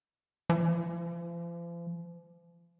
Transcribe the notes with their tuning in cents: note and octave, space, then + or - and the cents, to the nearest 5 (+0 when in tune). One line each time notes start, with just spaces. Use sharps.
F3 -40